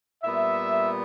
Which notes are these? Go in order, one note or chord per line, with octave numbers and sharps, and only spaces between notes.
A#2 G3 B3 E5